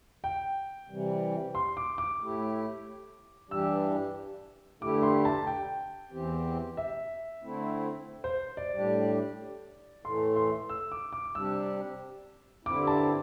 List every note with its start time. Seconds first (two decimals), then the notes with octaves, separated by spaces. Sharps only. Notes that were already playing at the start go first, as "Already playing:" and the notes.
0.24 G5
0.89 C3 E3 G3
1.55 C6
1.77 D6
1.98 D6
2.20 A2 A3 E4 G4
3.50 G2 E3 G3 D4 G4 E6
4.81 G2 D3 A3 E4 G4 D6
5.03 C6
5.25 A5
5.47 G5
6.12 E2 E3 C4 G4
6.77 E5
7.43 D3 A3 C4 E4
8.24 C5
8.57 D5
8.73 A2 G3 D4 G4
10.04 A2 E3 A3 C6
10.36 C6
10.69 E6
10.92 D6
11.13 D6
11.35 C3 G3 D4 G4 E6
12.65 G2 D3 C4 E4 D6
12.87 A5